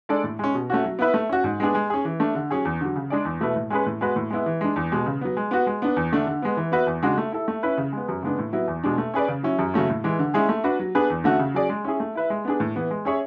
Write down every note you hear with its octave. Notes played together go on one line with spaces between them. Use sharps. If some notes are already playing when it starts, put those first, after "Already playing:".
G#3 D4 A4 D5
A2
G#3 C#4
B2
A3 C#4 F#4
F#3
B3 E4 B4 E5
A3
C#4 F#4
G#2
G#3 B3 D4 G#4
G#3
C#4 G#4
E3
A3 D4
D3
F#3 C#4 G#4
E2
D3 F#3
C#3
G#3 D4 G#4 D5
E2
B2 A3 E4 B4
A2
G#3 C#4 G#4 B4
A2
G#3 B3 F#4 B4
A2
G#3 B3 E4
E3
G#3 D4
E2
B2 G#3
C#3
F#3 B3
G#3
B3 F#4
G#3
B3 D4
E2
D3 A3 D4
D3
G#3 B3
E3
B3 F#4 B4 E5
E2
C#3 G#3 D4 F#4
A3
E4 A4
A3
C#4 E4 B4
C#3
G#3 B3
F#2
C#3 G#3 B3 D4
A2
F#3 B3 E4
E2
B2 G#3 D4
A3
C#4 G#4 B4 D5
C#3
F#3 C#4 E4
F#2
C#3 F#3 A3 C#4
A2
E3 G#3
D3
G#3 C#4 E4 G#4
A3
D4 F#4 B4
F#3
B3 D4 G#4 B4
E2
D3 A3 C#4 F#4
C#3
F#3 C#4 G#4 D5
G#3
C#4 E4 G#4
A3
E4 B4 E5
G#3
B3 D4 G#4
A2
E3 B3
G#3
C#4 G#4 C#5 E5